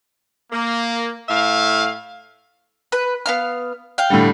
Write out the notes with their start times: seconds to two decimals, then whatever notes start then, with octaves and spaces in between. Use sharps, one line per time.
0.52 A#3
1.29 A2 E5 F5
2.92 B4
3.26 B3 F5 F6
3.98 F5 G5
4.10 A2 D3 G3